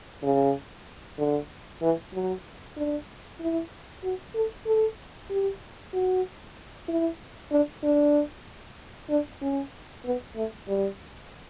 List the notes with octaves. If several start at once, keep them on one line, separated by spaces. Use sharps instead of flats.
C#3
D3
E3
F#3
D4
E4
F#4
A4
A4
G4
F#4
E4
D4
D4
D4
C#4
B3
A3
G3